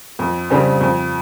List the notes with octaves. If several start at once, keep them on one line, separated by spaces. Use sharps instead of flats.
F2
C#3 G3 C4
F2